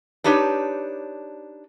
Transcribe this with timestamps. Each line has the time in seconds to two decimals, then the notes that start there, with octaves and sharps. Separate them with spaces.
0.24 D4 D#4 G4 B4 C#5